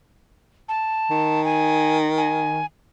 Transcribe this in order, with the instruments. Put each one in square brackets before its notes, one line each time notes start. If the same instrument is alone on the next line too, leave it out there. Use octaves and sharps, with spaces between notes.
[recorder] A5
[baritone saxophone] D#3
[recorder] G#5
G#5